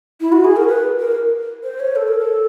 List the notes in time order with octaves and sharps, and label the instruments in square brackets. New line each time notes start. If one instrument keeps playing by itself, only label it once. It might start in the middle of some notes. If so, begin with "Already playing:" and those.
[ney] E4
F#4
G#4
A#4
B4
A#4
C5
C#5
A4
A#4
A4